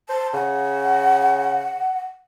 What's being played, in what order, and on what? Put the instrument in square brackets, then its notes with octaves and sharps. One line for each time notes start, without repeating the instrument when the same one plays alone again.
[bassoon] C5 [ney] A5
[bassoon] C#3 [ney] F#5